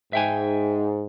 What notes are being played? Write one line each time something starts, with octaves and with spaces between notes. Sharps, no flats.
G#2 E5 G5 G#5